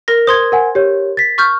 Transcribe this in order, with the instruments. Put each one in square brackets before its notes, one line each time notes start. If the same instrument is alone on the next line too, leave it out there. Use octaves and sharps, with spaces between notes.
[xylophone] A#4 A#6
[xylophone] C5 C6 G#6 [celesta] D#6
[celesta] A#4 F#5 G#5
G4 C#5
A6 B6
[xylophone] C#6 F6 G6